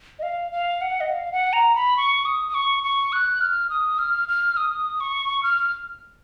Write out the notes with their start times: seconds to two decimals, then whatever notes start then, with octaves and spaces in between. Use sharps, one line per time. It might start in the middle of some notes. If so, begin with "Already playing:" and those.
0.19 D#5
0.23 F5
0.52 F5
0.81 F#5
1.00 D#5
1.09 F5
1.32 F#5
1.53 A#5
1.75 B5
1.97 C#6
2.25 D#6
2.48 D#6
2.54 C#6
2.83 C#6
3.12 F#6
3.41 F6
3.70 D#6
3.98 F6
4.28 F6
4.57 D#6
5.00 C#6
5.43 F6